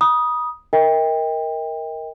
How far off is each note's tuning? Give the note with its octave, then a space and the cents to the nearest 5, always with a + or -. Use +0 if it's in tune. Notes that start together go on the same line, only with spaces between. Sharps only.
B5 -35 D#6 +0
A#4 +0 D#5 +35 G5 +25